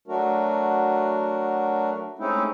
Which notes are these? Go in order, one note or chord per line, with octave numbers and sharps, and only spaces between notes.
F#3 A3 D4 F#4 A#4
G#3 A3 C4 C#4 D#4 E4